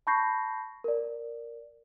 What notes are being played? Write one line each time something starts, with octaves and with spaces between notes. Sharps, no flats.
A5 B5 C#6 G6 A#6 C7
A#4 D5